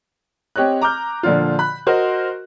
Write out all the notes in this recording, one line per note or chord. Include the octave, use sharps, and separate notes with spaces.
C4 G4 C#5 D#5 F#6
A#5 D6 F6 G6
A#2 D3 F3 D4 F4
B5 F#6
F#4 A#4 C5 D#5